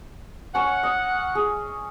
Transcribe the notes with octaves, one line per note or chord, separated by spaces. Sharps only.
C#4 C#5 F#5
D#5
G#4